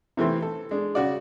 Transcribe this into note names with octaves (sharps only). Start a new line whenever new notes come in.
C3 E3 A3 C4
A4
G#3 D4
C#3 F#4 D5